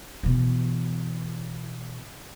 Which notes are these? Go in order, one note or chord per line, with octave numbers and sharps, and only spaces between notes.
B2 E3